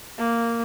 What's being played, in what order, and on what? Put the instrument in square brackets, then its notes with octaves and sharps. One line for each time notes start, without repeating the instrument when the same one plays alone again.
[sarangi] A#3